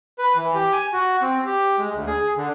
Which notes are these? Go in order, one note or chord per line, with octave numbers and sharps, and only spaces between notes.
B4
E3
G4
G#5
F#4
C4
G4
G#3
D2
G#4
D3